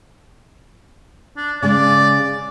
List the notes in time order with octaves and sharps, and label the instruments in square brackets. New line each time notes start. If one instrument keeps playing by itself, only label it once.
[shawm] D4
[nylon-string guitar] C#3 G#3 [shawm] D5